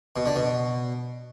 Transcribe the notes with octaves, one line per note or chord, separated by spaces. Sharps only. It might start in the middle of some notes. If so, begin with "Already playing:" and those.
B2
D3
B2